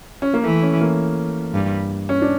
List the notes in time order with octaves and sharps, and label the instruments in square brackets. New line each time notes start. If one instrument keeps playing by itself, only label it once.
[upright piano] C#4
A#3
[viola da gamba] E3 [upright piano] A3
[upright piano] C#4
A#3
[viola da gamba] G2
[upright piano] C#4
D4